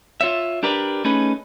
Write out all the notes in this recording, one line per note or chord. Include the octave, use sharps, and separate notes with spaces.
F4 C#5 E5
D4 G4 A#4 B4 D5
A3 C#4 D#4 G#4 B4